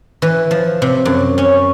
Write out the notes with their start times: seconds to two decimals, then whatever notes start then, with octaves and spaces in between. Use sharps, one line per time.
0.22 E3
0.51 F3
0.82 C3
1.05 F#2
1.38 C#4